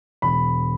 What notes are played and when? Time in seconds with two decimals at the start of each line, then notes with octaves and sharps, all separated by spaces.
0.22 E1 B5